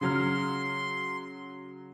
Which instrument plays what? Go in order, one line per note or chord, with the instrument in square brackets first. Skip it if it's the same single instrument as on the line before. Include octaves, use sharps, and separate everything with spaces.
[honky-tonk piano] C#3 F#3 F6 [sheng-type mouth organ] C6